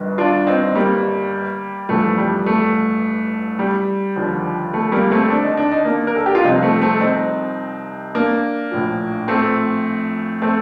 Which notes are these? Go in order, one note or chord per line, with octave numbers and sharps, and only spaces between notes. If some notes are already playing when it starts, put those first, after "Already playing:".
Already playing: G1 G2 D#3
D4 F4
C4 D#4
G3 A#3
A1 G2 F3 A3
G3
A3
G3
D#2 D3 F3
A3
G3 A#3
A3 C4
D4
D#4
D4
D#4
A#3 D4
A#4
A4
G4
F4
C2 C3 F3 C4 D#4
A3 C4
A3 C4
C4 D#4
A#3 D4
A#1 A2 F3
A3 C4
A3 C4